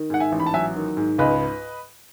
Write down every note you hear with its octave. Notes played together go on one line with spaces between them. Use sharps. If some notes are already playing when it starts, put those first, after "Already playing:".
Already playing: D#3
G#2 F#5
E5 G#5
A1
B5
A5
F#3 E5 G#5
D#3
G#2
C#2 B4 D#5